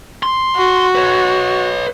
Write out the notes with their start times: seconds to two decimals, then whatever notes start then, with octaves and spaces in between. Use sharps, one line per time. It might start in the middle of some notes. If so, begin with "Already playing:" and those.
0.23 C6
0.56 F#4
0.95 B4 C#5